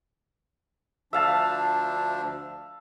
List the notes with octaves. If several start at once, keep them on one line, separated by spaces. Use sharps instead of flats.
D2 F3 D4 E5 F5 A5